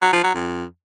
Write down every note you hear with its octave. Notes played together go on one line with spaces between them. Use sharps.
F#3
F3
F#3
F2